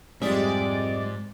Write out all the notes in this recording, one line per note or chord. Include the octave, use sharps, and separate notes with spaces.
F2 G#2 G3 G#3 D5 E5